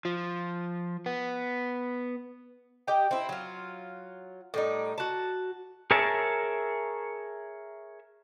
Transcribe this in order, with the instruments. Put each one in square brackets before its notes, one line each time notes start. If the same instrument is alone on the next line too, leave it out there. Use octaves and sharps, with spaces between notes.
[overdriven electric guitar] F3
B3
[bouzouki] G4 D#5 G5
C4 E4
F#3 F4
A2 G3 D#4
F#4 A5
[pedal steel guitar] G#4 A#4 C#5 E5 A5